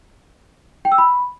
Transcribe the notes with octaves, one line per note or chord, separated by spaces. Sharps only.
G5
E6
B5